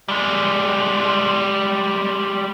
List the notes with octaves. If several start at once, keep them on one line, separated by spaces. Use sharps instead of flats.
G3 G#3